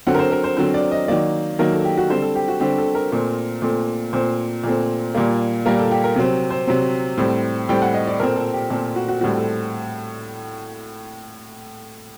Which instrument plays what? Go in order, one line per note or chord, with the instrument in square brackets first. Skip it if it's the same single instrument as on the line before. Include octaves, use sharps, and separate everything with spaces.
[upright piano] D3 F#3 C4 F#5
A#4
C5
A#4
C5
D3 F#3 C4 C5
D5
D#5
D#3 F#3 A#3 D5
D#3 F#3 A#3 A#4
A4
G4
F#4
D3 G3 C4 C5
A4
G4
F#4
D3 G3 C4 G4
A4
A#4
A#2 A3 C4
A#2 A3 C4
A#2 A3 C4 C5
A#2 A3 C4
A#2 G3 A#3
A#2 G3 A#3 A#4
A4
G4
A#4
C3 F#3 C4
C5
C3 F#3 C4
A2 G3 C4
A2 G3 C4 G5
F#5
D#5
D5
A#2 A3 C4 A#4
A4
G4
A#2 A3 C4 A4
F#4
F#4
A2 G3 C4 F#4
A4